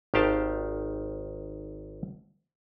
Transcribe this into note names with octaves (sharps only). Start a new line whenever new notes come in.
G#1 D#3 G4 F5 G5 A5